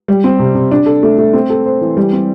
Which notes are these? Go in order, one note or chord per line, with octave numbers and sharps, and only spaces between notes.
G3
C4
C3
C3
D4
A4
A3
A3
C4
A4
C5
E3
G3
C4